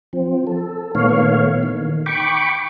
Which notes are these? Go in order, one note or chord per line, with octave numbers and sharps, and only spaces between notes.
F3 C4
A4
A#2 D#3 A3 B3 C#5 F5
D#3
G5 B5 C#6 D6